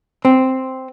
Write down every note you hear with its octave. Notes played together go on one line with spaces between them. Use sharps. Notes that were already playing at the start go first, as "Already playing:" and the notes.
C4